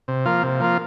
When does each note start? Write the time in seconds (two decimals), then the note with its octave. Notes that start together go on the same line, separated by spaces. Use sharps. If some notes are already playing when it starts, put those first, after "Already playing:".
0.08 C3
0.26 F3 A#3 F4
0.43 C3
0.60 F3 A#3 F4